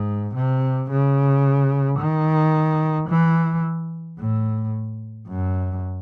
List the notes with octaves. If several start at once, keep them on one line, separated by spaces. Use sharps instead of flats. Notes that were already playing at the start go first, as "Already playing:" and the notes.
Already playing: G#2
C3
C#3
D#3
E3
A2
F#2